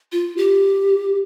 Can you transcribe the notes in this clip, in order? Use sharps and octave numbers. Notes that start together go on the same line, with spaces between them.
F4
G4